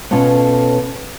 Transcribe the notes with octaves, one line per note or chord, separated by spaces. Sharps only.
B2 C#4 F4 A4 C#5